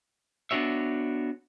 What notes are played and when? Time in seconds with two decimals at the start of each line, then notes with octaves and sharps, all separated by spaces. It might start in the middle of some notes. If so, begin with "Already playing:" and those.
0.51 B3 D4 F#4 C#5 E5